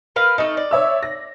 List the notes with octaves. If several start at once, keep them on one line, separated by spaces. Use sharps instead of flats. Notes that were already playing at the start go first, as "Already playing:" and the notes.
A#4 B4 F5
A3 D#4 D#5
D5
C#5 E5 E6
A#6